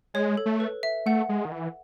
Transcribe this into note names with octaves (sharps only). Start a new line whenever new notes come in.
G#3 C#5
A4
A3
B4
E5
A3 F#5
G#3
D#3
E3